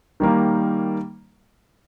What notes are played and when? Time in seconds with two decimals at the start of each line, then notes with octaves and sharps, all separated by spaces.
0.20 D#3 G3 A#3